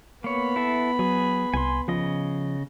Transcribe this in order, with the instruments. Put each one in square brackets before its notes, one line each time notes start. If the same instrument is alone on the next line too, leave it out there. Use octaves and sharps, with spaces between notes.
[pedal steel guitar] A#3 C#5 [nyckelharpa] B3 B5
[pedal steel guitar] E4 A4 E5
[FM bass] F#3 [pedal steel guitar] G#4
[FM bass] C2 [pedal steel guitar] G#5 C6
[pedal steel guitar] C#3 D#5 [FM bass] F3